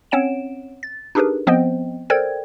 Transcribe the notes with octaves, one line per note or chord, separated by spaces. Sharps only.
C4 C#4 C#5 F#5 D7 E7
A6
D4 D#4 G4 G#4 A#4 B4
F3 B3 C4 C5 D#5 G5
A4 A#4 C5 D5 G5 G#6